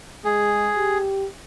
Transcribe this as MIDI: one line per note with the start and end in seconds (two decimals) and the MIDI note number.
0.25 0.70 56
0.25 0.98 68
0.76 1.26 67